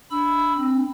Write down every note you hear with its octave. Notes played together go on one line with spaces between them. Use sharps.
D4 B5 E6
C4